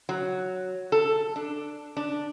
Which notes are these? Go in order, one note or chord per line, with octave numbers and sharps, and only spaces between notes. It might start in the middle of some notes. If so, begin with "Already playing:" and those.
F#3
A4
D4
D4